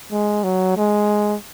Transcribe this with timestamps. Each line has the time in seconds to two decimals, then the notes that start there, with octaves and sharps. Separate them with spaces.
0.11 G#3
0.44 F#3
0.77 G#3